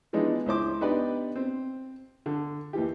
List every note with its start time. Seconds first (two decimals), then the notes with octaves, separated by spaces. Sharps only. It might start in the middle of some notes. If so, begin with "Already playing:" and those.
0.13 E3 F3 G#3 B3 D4 D#4
0.46 C#2 E4 C5 D6
0.81 B3 D4 D#4 G4 B4 D5
1.36 C4
2.26 D3
2.73 D#2 E3 G4